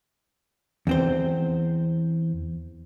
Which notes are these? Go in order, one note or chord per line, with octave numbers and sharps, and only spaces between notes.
E2 C4 C5